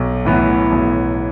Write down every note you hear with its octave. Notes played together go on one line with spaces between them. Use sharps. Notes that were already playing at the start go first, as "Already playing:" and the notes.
Already playing: B1
A2 E3 B3
B1